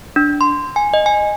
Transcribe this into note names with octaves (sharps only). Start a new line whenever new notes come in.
D4
C6
G#5
D#5
G#5